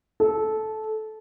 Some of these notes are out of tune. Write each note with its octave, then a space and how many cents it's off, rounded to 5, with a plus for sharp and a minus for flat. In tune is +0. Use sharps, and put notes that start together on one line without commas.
A4 -15